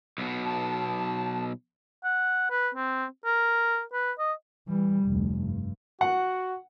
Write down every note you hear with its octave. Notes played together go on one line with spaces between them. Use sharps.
B1 B2
A5
F#5
B4
C4
A#4
B4
D#5
E3 G3
F1 D2
G2
F#4 F#5